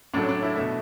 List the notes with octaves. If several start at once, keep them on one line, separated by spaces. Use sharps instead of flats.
A2 F#3 A3 D4
D4
E4
B2 A3 E5